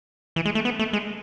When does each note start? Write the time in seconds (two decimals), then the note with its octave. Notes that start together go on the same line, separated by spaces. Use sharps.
0.36 E3
0.45 G#3
0.55 A3
0.65 B3
0.79 A3
0.93 G#3